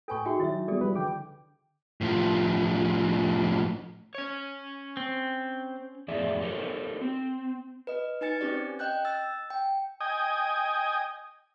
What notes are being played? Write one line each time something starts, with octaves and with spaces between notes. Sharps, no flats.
A2 A4 B4 G5 G#5 C#6
D#4 F#4 G#4 E5 G5
D#3 F#3 E4 C#5 E5
G3 G#3 B3 G#4 A4 D5
F3 G3 B4
D3 G5 D6
A2 F3
C#4 C#5
C4
F2 A2 F3 G#4 D5 E5
G4 A4 A#4 C5 C#5
C4
B4 D#5
D#4 B4 G#5 A6 C#7
C4 C#4 G4 D5
D#5 G5 F#6 G6
E6 A6
G5
D#5 G5 G#5 D#6